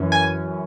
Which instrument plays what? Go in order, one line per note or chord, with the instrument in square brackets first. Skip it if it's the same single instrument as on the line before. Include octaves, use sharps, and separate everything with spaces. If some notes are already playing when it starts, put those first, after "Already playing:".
Already playing: [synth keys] F#2 E3 C#4
G#5